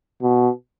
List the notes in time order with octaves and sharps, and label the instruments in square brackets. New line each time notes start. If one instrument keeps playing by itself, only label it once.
[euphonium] B2